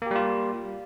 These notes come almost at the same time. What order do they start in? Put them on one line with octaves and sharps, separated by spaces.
A#3 G4 G3 F4